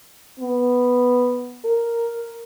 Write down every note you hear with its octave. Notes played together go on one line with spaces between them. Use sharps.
B3
A#4